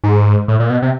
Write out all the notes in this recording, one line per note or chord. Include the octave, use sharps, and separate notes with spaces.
G#2
A2
A#2
B2
C3